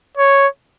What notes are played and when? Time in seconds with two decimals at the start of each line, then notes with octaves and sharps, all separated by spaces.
0.17 C#5